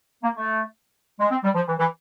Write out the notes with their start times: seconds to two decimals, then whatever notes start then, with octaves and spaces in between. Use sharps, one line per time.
0.23 A#3
0.36 A3
1.20 G#3
1.31 C4
1.44 G3
1.55 F3
1.68 E3
1.79 E3